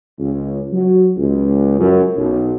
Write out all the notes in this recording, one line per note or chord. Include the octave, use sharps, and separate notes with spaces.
C#2
F#3
C#2
F#2
B1